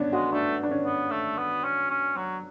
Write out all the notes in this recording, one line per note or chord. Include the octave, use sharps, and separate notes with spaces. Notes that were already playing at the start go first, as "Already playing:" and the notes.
Already playing: B3 C#4 D4
G#3 F#4
A3 D4
D4
C#4
B3
A3
B3
C#4
C#4
F#3